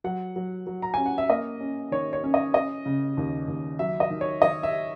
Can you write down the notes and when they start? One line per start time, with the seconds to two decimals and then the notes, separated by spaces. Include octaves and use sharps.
0.04 F#3 F#5
0.36 F#3
0.67 F#3
0.82 A#5
0.94 C#4 G#5
1.06 F#5
1.18 E5
1.29 A#3 D#5
1.61 C#4
1.92 D#3 C#5
2.13 C#5
2.24 C#4
2.34 D#5
2.54 C#4 D#5
2.86 C#3
3.17 D#2
3.48 D#2
3.79 F#3 E5
4.00 D#5
4.10 D#3
4.21 C#5
4.42 D#3 D#5
4.63 E5